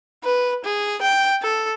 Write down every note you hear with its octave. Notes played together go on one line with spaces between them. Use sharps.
B4
G#4
G5
A4